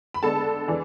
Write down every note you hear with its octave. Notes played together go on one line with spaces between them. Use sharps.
B5
D3 G#3 B3 D4 A4 A5
E3 G#3 D4